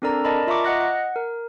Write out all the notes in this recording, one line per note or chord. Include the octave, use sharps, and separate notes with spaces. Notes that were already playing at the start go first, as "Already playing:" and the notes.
C4 D4 A4 A#4 D5 A#5
A#4 D5 D#5 A5 B5
F4 E5 A#5 C#6 D6
D#5 F#5 F#6 A#6
F#5
A#4